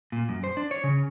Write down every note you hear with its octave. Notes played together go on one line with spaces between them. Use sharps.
A#2
F#2
C5
D4
C#5
C#3